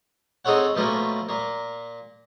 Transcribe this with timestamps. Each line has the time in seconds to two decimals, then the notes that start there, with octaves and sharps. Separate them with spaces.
0.45 C4 D#4 G#4 A4 C#5 F#5
0.76 B2 F3 A3 A#3 C#4
1.29 A#2 A#3